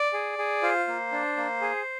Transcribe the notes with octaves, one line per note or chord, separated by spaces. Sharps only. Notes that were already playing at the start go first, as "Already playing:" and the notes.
Already playing: D5
G#4
G#4
F4 C5
A#3
D4
A#3
G#4